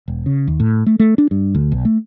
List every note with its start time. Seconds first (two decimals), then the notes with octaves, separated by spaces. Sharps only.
0.08 E1
0.26 C#3
0.47 D#2
0.60 A2
0.86 A3
0.99 A3
1.18 D4
1.31 G2
1.55 D2
1.72 B1
1.85 A3